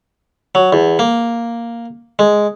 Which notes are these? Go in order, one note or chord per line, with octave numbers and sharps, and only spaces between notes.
F#3
E2
A#3
G#3